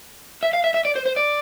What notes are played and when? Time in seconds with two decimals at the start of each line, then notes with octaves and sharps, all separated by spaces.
0.43 E5
0.53 F5
0.64 E5
0.74 E5
0.85 D5
0.95 C5
1.05 C5
1.16 D5